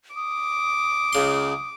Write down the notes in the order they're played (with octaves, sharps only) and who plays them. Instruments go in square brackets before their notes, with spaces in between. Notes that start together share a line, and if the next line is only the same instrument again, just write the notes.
[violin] D6 [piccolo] D#6
[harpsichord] C#2 C#3 C6